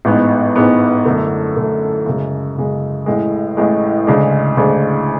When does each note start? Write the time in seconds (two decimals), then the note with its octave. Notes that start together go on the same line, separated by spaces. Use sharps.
0.05 A1 G#2 G#3 B3
0.56 A1 G#2 G#3 B3
1.05 F#2 D3 A3
1.56 F#2 D3 A3
2.06 F#2 C#3 G#3
2.57 F#2 C#3 G#3
3.06 A1 A2 G#3
3.57 A1 A2 G#3
4.07 D2 C#3 G#3 D4
4.57 D2 C#3 G#3 D4